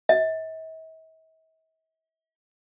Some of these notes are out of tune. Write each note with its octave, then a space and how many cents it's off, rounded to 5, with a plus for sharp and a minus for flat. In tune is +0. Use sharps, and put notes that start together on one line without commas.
E5 -45